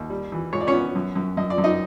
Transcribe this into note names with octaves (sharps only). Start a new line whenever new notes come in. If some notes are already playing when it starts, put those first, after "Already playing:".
Already playing: D#2
G3
E3
G#2 C#5
D5
C#4 C#5
B3
F#2
F#2
F#2 D#5
D5
F#2
D#4 D#5